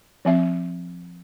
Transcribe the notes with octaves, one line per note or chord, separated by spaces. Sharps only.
F3 C4 E5